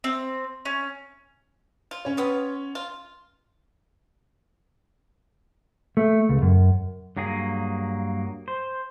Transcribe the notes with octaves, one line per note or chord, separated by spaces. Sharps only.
C4
C#4
F4
C#4 C#5
G3 B3 F4
F4
A3
C#2
F#2
G2 F#3 A#3 G#4
C5